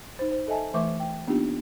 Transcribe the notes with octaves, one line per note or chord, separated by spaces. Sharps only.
D#4 C5
C5
A4 D#5 E5 G#5 A5
E3 A3 B4 E5 C#6 D6
G5
A#3 B3 D4 D#4 F4 G4